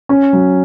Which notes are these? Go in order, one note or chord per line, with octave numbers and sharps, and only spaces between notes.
C#4
F#3